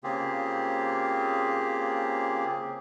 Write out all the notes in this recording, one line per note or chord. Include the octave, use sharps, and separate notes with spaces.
C#3 A#3 C4 F4 G4 G#4